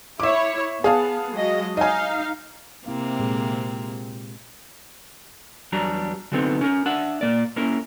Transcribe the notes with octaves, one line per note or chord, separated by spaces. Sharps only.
E4 C#5 E5 D6
B3 G#4 F5 A5
F#3 G#3 D#5
D#4 D#5 F5 G#5
C3 A#3 C4 E4 F5
A#2 G#3 G#4
E2 F#3 G3 D4 A#5
D3 F#3 A3 B3 C4 D#4
C#4 A#4
D4 E5 F#5
A#2 A#3 D5
A#3 C#4 E4 A#4